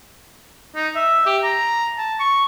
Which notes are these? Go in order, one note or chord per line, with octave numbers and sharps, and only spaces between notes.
D#4
E5
G4
A#5
A5
C#6